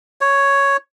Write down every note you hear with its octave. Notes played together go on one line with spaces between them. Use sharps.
C#5